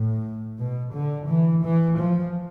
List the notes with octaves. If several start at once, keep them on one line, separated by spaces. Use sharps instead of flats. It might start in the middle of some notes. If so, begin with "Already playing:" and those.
Already playing: A2
B2
D3
E3
E3
F3